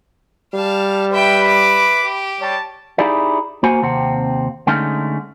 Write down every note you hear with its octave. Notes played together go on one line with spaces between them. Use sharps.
G3 F5 A5
B4 E5 G5 B5
E5 D6
G4
G3 C#5 A5
D#4 E4 G4 G#4 D5
A#3 F#4 C5 F#5 G#5
D#2 C3 C4 F#5
D3 G#3 A3 C#4 D#4